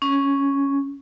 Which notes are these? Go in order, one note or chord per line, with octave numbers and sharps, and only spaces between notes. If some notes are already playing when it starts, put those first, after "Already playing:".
C#4